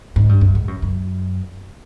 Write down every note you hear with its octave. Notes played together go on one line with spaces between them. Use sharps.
G#2
G2
F#2
G#2
F#2
F#2